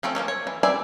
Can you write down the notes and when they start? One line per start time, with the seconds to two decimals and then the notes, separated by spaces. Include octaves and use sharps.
0.03 F3 A3 C4 C#4
0.15 F3 F#3 A#3 C#4
0.28 C#5
0.47 E3
0.63 C4 B4 D5 E5 G#5